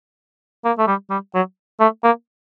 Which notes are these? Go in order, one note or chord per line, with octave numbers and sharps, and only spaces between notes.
A#3
A3
G3
G3
F#3
A3
A#3